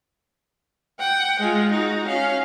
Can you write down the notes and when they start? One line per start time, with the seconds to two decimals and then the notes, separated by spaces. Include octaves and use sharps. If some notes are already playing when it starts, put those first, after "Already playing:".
1.00 F#5 G5
1.40 G#3 F4
1.71 D#4 F#4
2.07 C#4 F5